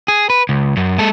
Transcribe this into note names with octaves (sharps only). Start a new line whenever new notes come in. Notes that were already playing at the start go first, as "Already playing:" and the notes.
G#4
B4
C#2
F#2
G#3 A4